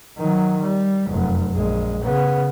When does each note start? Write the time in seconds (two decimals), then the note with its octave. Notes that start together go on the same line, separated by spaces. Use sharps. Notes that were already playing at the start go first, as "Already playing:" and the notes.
0.18 D#3 F#3
0.62 G3
1.07 F1 F#2
1.54 A#1 G#3
2.03 C#3 B3